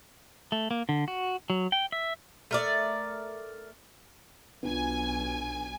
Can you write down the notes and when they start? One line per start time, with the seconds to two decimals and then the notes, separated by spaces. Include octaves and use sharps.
0.52 A3
0.71 A#3
0.89 D3
1.08 F#4
1.50 F#3
1.72 G5
1.92 E5
2.51 A3 A#4 D5
4.63 B1 B3 D4 F4 G#5